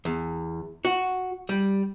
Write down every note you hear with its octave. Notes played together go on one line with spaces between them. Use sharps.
E2
F#4
G3